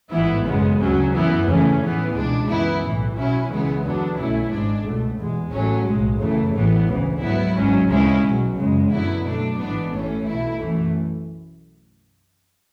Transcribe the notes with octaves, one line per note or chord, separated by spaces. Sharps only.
A1 G#2 E3 B3 E4
F#2 C#3 G#3 B3
D2 C#3 F#3 C#4
F#2 E3 B3 E4
E2 C#3 E3 A3 C#4
A2 E3 B3
C#2 B2 G#3 D4
F#2 E3 B3 E4
B1 A2 E3
B2 F#3 C#4 E4
C#2 C#3 E3 G#3 B3
E2 D3 F#3 B3 D4
B1 B2 A3 C#4 E4
G#1 G#2 G#3 D4
C#2 B2 A3
E2 B2 G#3
A1 A2 F#3 A3 C#4
B1 A2 G#3
F#2 C#3 E3 A3
A1 A2 E3 B3
D2 C#3 E3
G#2 F#3 B3 E4
G#1 G#2 F#3 C#4
D2 C#3 G#3 C#4 E4
B1 B2 F#3
F#2 C#3 G#3
F#2 D3 F#3 B3 E4
B2 F#3 A3 D4
A1 G#2 E3 B3 D4
A1 A2 E3 A3 C#4
B1 B2 A3 E4
F#2 E3 A3